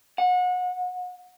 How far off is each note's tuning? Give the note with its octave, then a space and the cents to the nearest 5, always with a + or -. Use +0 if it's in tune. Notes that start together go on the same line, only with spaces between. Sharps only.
F#5 -30